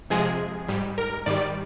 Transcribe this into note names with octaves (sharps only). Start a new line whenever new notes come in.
F2 C3 F3 G#3 G#4
G#2 G3
A#4
G#2 D#3 G3 D5